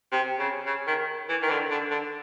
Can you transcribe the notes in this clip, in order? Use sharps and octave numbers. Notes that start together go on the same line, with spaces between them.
C3
C#3
C#3
D#3
E3
D#3
D3
D3
D3